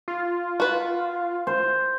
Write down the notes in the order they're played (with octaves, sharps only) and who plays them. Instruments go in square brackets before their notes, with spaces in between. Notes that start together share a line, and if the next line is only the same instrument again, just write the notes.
[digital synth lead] F4
[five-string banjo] F#4 B4
[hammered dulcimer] C5